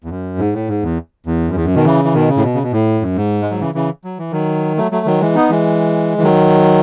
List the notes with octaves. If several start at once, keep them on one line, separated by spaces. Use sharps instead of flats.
E2
F#2
G#2
A2
G#2
E2
E2
F#2
E2
F#2
B2 D#3
C#3 E3
E3
B2 D#3
C#3
A2
B2
C#3
B2
A2
F#2
G#2
G#3
F#3
C#3 E3
C#3 E3
F#3
E3
D#3 F#3
F#3 A3
F#3 A3
D#3 F#3
E3 G#3
B3 D#4
E3 G#3
E3
D#3 F#3